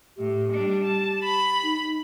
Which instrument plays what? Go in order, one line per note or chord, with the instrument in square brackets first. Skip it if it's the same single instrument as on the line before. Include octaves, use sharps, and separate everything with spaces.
[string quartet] A2 [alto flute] G4
[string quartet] G3 D4
A5
B5
[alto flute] D#4